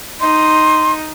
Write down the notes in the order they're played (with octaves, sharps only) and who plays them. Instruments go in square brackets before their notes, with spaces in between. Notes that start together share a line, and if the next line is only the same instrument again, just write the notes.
[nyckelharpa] D#4 [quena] C6